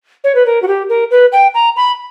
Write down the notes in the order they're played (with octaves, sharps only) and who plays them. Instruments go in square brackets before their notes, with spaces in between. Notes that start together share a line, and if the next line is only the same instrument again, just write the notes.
[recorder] C#5
B4
A#4
F#4
G4
A#4
B4
G5
A#5
B5